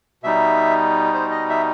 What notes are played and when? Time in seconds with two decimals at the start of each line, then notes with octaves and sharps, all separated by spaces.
0.23 B2 G3 D#4 E5
1.14 C5
1.31 D#5
1.49 E5